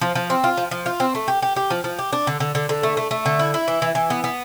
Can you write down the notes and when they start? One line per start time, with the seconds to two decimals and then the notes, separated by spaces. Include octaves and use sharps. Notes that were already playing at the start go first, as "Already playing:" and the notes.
0.01 F3
0.15 F3
0.30 C4
0.44 F4
0.57 F3
0.71 F3
0.86 F4
1.00 C4
1.15 A3
1.28 G4
1.42 G4
1.56 G4
1.70 F3
1.84 F3
1.99 G4
2.13 D4
2.27 D3
2.40 D3
2.55 D3
2.69 D3
2.83 A3
2.97 A3
3.11 A3
3.26 D3
3.39 E4
3.54 E4
3.68 E3
3.82 E3
3.95 E3
4.10 B3
4.24 B3